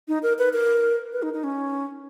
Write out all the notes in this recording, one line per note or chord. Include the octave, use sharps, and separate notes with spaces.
D#4
A#4
B4
A#4
B4
D#4
D#4
C#4